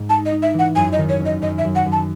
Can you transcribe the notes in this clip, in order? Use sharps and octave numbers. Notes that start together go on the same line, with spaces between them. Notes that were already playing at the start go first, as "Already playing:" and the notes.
Already playing: G#2 G#3
D#4 A5
D#5
D#4
E5
E3 F#5
F#2 G#5
D#5
D#3
C#5
C#4
D#5
F#2 D#5
E5
F#2
F#5
F#2
A5